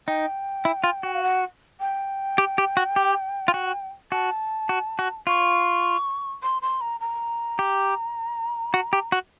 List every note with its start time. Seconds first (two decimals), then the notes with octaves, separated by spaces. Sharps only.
0.08 D#4 G5
0.65 E4
0.84 F4
1.03 F#4
1.13 F5
1.23 F#5
1.80 G5
2.38 G4
2.58 G4
2.77 F#4
2.96 G4
3.48 F4
3.54 F#4
4.11 F#4 A5
4.69 F#4
4.99 F#4
5.27 F4 C#6
6.43 C6
6.62 C6
6.81 A#5
7.01 A#5
7.59 G4
8.74 F#4
8.93 G4
9.12 F#4